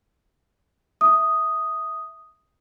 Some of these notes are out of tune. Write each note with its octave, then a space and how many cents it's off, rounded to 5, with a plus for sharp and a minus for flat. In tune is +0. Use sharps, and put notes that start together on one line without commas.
E5 +0 D#6 +0